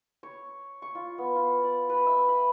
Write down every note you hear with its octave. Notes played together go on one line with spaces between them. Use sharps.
C#5
C#6
F4
B3
F4
D5
B4
E5
B5